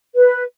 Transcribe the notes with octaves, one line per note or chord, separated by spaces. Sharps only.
B4